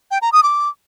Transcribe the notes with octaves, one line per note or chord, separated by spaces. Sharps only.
G5
A#5
D#6
D6